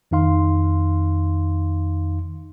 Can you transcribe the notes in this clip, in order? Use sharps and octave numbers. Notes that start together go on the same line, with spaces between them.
F2 D#3 D#4 F5 C6